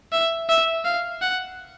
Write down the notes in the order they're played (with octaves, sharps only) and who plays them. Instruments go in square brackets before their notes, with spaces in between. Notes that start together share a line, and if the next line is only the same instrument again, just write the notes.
[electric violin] E5
E5
F5
F#5